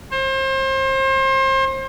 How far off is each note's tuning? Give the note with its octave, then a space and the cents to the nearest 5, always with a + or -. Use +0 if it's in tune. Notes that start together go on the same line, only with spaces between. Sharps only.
C5 +35